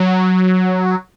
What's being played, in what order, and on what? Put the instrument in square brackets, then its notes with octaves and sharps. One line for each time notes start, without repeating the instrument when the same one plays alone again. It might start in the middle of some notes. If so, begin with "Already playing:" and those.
Already playing: [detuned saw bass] F#3